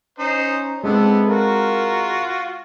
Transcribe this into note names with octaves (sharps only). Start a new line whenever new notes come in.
C#4 D#4 C5
G#3 B3 C4 D4 E4 A4
F4 F#4 A#4